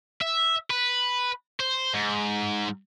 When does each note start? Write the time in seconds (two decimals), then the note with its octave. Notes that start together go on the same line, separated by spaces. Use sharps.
0.21 E5
0.70 B4
1.60 C5
1.94 G#2